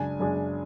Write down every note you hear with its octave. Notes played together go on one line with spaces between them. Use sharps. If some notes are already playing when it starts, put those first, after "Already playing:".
Already playing: F#2 C#3 G#3 D4 G#5
F#2 C#3 G#3 D4